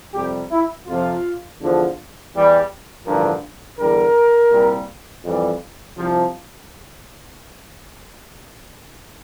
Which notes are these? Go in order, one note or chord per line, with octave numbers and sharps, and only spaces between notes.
F2 C3 G3 G4
E4
F2 C3 F3 F4
E2 D3 F3
E2 E3 G3
A1 G2 D3 F3 A#4
E2 D3 G3 A#4
C2 A#2 G3
F2 E3 G3
C2 C3 F3